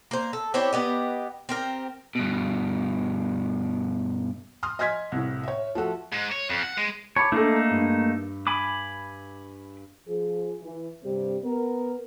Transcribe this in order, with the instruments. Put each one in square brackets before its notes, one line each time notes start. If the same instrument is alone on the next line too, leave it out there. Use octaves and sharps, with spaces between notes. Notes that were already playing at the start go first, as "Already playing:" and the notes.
[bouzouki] A#3 C5
A4
C4 E4 G4 C#5
B3 G4 D#5
C4 G4 A#4
[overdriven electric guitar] G2 B2
[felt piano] C6 D#6 F6
D#5 G#5 C6 F6 G#6 B6
C2 A2
C#5 E5
F3 A3 F#4 A4
[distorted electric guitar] G#2
C#5
F2
F#5
G#3
[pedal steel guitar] C#5 [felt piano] A5 B5 D6
[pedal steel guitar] A3 A#3 D#4 [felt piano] D4 A4
[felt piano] G2
[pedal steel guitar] G#5 B5 D6
[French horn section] F3 G#4
E3
G2 C3 G3 C4 G4
B3 A#4